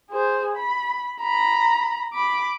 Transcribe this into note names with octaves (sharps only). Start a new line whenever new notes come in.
G#4 C5
B5
A#5 B5
B5 D6